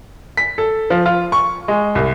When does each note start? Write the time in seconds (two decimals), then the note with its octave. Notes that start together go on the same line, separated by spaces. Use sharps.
0.37 B6
0.58 A4
0.90 F3
1.06 F4
1.32 C#6
1.68 G#3
1.95 C2